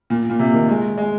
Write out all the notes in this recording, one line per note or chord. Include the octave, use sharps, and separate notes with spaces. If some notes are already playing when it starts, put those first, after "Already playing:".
A#2
A#2
C3
D#3
G#3
G#3